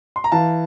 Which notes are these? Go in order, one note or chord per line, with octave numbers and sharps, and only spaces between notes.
C6
A#5
E3 F5 A5